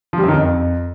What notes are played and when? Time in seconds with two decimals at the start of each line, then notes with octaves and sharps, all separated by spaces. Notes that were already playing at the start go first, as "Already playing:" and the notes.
0.13 F3
0.18 G3
0.23 F#2
0.28 D#3
0.34 F2